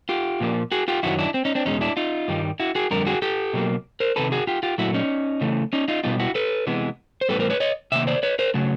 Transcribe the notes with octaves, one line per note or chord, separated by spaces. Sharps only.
F4 G4
A#2 F3 A#3
F#4 G#4
F4 G4
F#2 D#3 F#3 E4 F#4
D4 E4
C4
C#4 D#4
C4 D4
E2 B2 G#3 C#4 D#4
D4 E4
D#4 F4
G2 D#3 G3
E4 F#4
F#4 G#4
F2 D3 G3 A#4
F#4 G#4
G4 A4
B2 F#3 A#3
A#4 C5
C3 D#3 A4 B4
F#4 G#4
F4 G4
F4 G4
A#2 F#3 A3 E4 F#4
C#4 D#4
C#3 E3 A3
C#4 D#4
D#4 F4
B2 G3 B3 D#4 F4
E4 F#4
A4 B4
C3 E3 G#3 B3
C5
A2 E3 G3 B3 A4 B4
A#4 C5
B4 C#5
C#5 D#5
C3 D#3 A#3 E5
C5 D5
B4 C#5
A#4 C5
C#3 F#3 A3